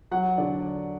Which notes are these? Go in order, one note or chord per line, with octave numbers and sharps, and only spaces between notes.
F#3 F#5
D3 D5